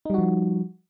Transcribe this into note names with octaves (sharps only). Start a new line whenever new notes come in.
F3 G3 D#4 F#4